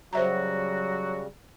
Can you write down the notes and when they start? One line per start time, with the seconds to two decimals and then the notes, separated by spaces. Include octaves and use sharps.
0.13 C#3 F#3 G3 F#4 C5 E5 A#5